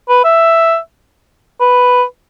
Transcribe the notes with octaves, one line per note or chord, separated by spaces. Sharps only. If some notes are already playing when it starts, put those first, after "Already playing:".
B4
E5
B4